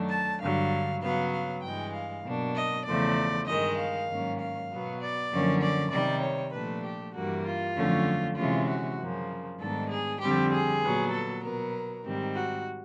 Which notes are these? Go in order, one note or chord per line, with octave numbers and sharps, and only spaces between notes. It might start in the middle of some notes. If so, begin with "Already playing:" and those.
Already playing: F#2 D#3 F#3 A3 D4
A5
G2 D3 F#3 F5
C#3 F#3 B3 F5
F5
G2 E3 G#3 G5
F5
B2 F#3 A#3 D4
D#5
E2 C#3 F3 A3 D5
G2 D#3 G#3 D#5
F5
G#2 D#3 F#3 A#3 C#4
F5
B2 F#3 B3
D5
F#2 D3 F3 A#3 C#4
D5
C3 D#3 G3 D5
C#5
A#2 F3 A3 D4 B4
G4
G2 E3 G3 A#3 F#4
F4
F2 D3 F#3 A3 C#4
C3 E3 G#3 C#4 F4
F#4
F#2 C#3 F3 A#3
G#2 D#3 G3 B3 D4 A4
G#4
F2 D3 G3 C4 G4
G#4
A#2 F#3 B3
A4
B2 F#3 B3 A#4
G#2 D#3 G3 C4
F#4